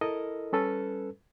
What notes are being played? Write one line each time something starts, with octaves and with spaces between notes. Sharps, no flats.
E4 A4 A#4 D#5
G3 C#4 A4 B4